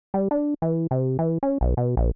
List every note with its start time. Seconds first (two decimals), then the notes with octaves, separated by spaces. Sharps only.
0.14 G3
0.31 D4
0.62 E3
0.91 C3
1.19 E3
1.43 C#4
1.61 B1
1.77 B2
1.97 A#1